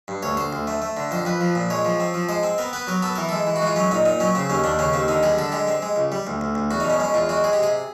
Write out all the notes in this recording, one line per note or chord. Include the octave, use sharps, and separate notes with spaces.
G2
D2 C#5
D2 C5
D2
A3
A3
D3
F2 C5
F2 B4
F3
A#2
G#3 C#5
F3
C4
F3
G#3 C5
C4
B3 A#4
B3 B4
F#3 A#4
B3 A4
E3 A#4
G#3 A4
E3
F#4
G#3 F4
F#3 C#4
A#2 D#4
A#2 D#4
F#3 C#4
C#3 C4
D#2 C#4
D#2 D4
C#3 C#4
D#2 C4
D3 D#4
G3 G#4
D3 A4
G#3 G4
C4
G#3
C#2
G3
D2
D2
D2
E2 F#4
B2 D#4
C#4
G#3 C#4
E2 F4
G#3 F#4
G#3 G#4
G4
C3 G#4